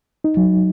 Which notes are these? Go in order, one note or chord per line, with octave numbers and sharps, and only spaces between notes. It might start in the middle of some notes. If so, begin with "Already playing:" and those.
D#4
F#3